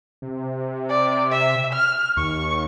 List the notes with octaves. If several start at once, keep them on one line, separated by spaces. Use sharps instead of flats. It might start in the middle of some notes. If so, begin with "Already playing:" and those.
C3
D5
E5
F6
D#2 C#6